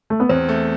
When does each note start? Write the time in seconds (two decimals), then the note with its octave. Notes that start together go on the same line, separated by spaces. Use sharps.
0.10 A3
0.20 B3
0.29 E2 C4
0.49 A3